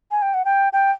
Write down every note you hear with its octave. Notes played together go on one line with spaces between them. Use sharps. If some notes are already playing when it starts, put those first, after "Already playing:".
G#5
G5
F#5
G5
G5